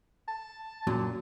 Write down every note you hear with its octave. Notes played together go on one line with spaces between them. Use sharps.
A5
F#2 A#2 F#3